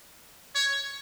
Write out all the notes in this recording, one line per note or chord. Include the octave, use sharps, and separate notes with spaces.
C#5